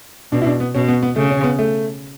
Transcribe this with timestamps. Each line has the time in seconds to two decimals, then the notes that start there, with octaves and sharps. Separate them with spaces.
0.32 B2 D4
0.42 E4
0.47 D4
0.60 B3
0.75 B2 C#4
0.88 B3
1.03 B3
1.16 C#3 A3
1.31 C#4
1.44 B3
1.59 A3